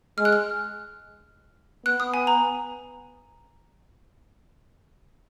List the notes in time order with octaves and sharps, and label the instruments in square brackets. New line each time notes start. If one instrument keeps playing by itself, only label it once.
[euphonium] G#3 [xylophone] F6
[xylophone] F#6
F6
[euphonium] B3 [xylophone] F#6
[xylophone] D#6
G#5
A#5